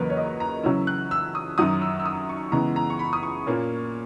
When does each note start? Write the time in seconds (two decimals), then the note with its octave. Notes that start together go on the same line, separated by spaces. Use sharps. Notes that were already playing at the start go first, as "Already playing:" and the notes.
Already playing: E2 C#3 F#3 A#3 A#4 B4 D#5
0.10 C#5
0.17 D#5
0.40 A#5
0.64 C#3 F#3 C#4 E4 E6
0.87 F#6
1.11 E6
1.35 D#6
1.58 F#2 D#3 F#3 D#6
1.82 E6
2.00 E6
2.05 D#6
2.29 C#6
2.52 C#3 E3 G#3 B3 E4 A#5
2.76 A#5
2.90 C#6
2.99 B5
3.13 D#6
3.23 C#6
3.46 A#2 A#3 C#4